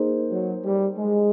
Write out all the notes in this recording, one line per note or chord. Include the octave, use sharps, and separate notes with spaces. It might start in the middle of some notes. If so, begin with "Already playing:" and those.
Already playing: A#3 D#4 G#4 C5
F#3
G3
G#3